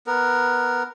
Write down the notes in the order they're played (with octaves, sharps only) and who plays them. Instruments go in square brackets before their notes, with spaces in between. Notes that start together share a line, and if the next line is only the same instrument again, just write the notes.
[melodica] B3 A#4